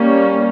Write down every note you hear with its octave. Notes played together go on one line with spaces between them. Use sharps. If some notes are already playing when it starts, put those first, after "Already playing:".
Already playing: G3 A#3 C#4